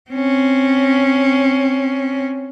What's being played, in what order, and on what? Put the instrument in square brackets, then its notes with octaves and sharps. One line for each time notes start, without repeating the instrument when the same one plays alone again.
[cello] C4 C#4